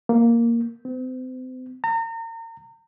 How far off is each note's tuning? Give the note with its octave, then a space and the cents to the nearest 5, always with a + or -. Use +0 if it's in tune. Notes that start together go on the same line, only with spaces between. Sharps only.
A#3 +0
C4 -40
A#5 -35